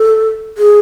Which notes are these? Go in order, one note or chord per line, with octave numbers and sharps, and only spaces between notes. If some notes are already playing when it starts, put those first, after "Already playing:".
Already playing: A4
G#4